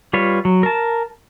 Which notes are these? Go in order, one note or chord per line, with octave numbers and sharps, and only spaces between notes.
G3 F4 B4 C#5
F#3
A#4 A5